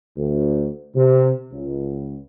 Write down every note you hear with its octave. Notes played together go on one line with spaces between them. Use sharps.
D2
C3
C#2